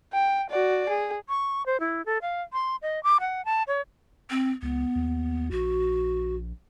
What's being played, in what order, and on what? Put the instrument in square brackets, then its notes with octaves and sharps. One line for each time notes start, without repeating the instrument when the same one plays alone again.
[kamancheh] G5
F#4 D5
G#4
[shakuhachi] C#6
C5
E4
A4
F5
C6
D#5
D6
F#5
A5
C#5
[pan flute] C4
[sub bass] C#2 [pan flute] B3
[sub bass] D#2
[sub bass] A#1 [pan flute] F#4